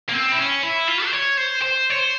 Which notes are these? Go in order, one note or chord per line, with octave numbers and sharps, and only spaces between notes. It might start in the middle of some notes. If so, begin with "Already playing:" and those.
A#3
C4
E4
C#4
E4
F4
C5
C#5
C5
C5
C#5
C5